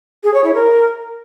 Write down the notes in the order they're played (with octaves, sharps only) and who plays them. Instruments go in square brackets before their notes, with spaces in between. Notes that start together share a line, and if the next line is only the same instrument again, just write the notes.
[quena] G#4
C#5
E4
A#4